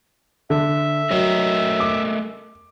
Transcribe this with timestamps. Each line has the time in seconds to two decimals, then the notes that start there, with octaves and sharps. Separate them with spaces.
0.50 D3 E5
1.11 F#3 A3 A#4 D#5
1.80 D6